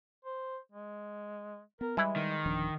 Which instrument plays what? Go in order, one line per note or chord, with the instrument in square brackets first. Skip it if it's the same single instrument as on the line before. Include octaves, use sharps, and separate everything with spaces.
[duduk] C5
G#3
[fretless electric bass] B3 [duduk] A#4
[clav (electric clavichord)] E3 E4 [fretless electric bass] G3 [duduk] G#3
[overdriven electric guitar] D#3
[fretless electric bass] D1 F3 D4